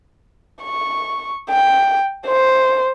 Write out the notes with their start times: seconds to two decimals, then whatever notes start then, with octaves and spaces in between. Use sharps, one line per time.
0.63 C#6
1.50 G5
2.26 C5